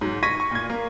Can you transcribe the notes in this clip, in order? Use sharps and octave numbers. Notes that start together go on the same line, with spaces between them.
G#2 F#3
C#6 G#6 A#6 B6 D#7
C#6
A#2 G#6
A#3